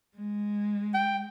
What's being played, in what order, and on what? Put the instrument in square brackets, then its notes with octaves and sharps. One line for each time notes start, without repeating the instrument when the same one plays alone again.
[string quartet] G#3
[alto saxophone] G5